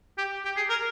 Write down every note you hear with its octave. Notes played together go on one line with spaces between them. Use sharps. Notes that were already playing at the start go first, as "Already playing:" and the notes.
G4
G4
G#4
A#4